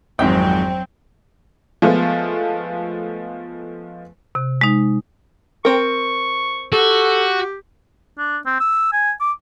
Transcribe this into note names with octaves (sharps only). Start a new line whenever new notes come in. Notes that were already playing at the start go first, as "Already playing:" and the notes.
G#1 F2 G#2 F#3 C4 G5
F3 G#3 A3 B3 F4
C3
G#3 D#4
C4 A#4 C#6
F#4 G4 A4
D4
C4
E6
G#5
D6